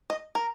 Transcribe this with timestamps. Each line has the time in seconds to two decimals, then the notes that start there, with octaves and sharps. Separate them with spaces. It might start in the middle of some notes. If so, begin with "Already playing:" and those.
0.10 D#5
0.35 A#4